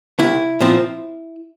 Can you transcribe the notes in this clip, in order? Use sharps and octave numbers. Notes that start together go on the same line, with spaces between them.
C2 E4
A#2 F3 C4